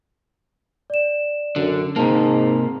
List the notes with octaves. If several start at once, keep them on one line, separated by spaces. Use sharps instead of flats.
D5 E7
F#2 D3
G#2 C3 A#3 A5 A#5